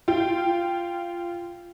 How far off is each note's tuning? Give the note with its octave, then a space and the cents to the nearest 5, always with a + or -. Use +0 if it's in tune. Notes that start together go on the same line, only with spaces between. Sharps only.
F4 -15 G5 +0